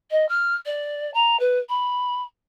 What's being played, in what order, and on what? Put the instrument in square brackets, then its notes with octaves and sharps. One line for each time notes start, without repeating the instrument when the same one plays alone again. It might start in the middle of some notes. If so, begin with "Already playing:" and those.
[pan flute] D#5
F6
D5
A#5
B4
B5